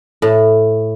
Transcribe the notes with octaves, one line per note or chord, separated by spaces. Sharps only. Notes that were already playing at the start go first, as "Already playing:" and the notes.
A2